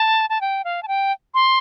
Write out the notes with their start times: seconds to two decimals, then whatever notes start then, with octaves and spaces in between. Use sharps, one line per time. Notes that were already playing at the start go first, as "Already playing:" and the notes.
Already playing: A5
0.30 A5
0.41 G5
0.64 F5
0.83 A5
0.88 G5
1.34 C6